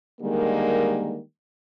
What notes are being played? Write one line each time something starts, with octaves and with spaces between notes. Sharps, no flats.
D3 D#3 G3 G#3 A#3 A#4